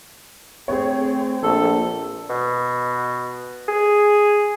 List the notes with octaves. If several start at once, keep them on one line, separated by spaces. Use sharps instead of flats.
A3 C4 G#4 C#5
A#1 A4
B2
G#4